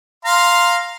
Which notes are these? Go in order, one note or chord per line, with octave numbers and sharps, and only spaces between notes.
F5 A#5 C6